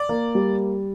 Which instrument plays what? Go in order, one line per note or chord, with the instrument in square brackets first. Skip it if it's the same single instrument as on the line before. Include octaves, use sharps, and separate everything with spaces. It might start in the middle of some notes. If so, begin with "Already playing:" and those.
Already playing: [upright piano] D5
[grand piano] A#3
G3